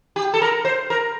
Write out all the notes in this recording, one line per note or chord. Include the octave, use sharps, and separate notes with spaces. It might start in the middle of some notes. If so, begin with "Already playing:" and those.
G4
A4
A#4
C5
A#4